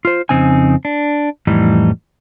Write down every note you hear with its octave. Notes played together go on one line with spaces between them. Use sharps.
F4 C5
F2 C#3 C4 D#4 G#5
D4
F2 A2 E3 G3 D#4